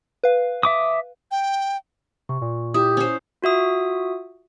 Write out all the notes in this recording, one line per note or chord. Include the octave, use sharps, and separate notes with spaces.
B4 F5
E5 D6 D#6
G5
C3 C#6
A#2
E4 G4 D#6
C#4 C5
F4 F#4 E5 D#6